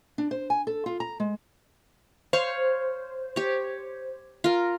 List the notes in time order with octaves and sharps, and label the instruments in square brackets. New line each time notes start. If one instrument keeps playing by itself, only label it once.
[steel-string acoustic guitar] D4
C5
G#5
A4
F4
A#5
G#3
[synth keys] C5 [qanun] C#5 F5 C#6
[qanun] G4 C#5
F4 A#4